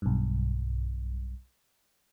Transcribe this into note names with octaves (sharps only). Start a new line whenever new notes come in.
B1 G2